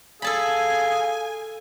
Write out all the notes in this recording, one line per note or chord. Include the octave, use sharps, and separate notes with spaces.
G#4 A4 F5 G#5 A5 B5